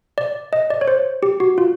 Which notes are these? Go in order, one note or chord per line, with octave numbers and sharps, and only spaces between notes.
D5
D#5
D5
C#5
C5
G4
F#4
F4